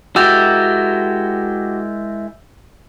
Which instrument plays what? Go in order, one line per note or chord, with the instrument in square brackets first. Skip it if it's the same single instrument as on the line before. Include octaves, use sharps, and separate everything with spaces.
[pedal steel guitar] G#3 E4 A#4 [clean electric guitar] F#4 G4 [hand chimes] E6 G6 A6